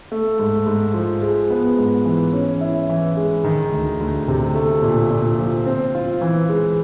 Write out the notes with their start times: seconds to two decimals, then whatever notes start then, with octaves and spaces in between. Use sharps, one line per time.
0.12 A3
0.39 G#2
0.67 G#2
0.94 F3
1.22 G#3
1.50 B3
1.78 G#2
2.05 E3
2.33 C#4
2.61 E4
2.89 E3
3.17 G#3
3.44 D#3
3.72 D2
4.00 D2
4.28 C3
4.55 A3
4.82 A#2
5.11 A#2
5.39 F3
5.66 C4
5.95 F4
6.21 E3
6.49 G#3